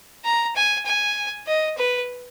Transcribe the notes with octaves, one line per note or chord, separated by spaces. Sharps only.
A#5
G#5
G#5
D#5
B4